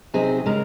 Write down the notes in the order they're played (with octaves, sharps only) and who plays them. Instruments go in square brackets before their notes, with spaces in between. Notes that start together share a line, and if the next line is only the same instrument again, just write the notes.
[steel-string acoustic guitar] C3 F#3 C4 D#4 G#4
C#3 G#3 A#4